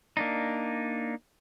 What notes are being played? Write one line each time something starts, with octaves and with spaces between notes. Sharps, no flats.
A#3 D4 D#4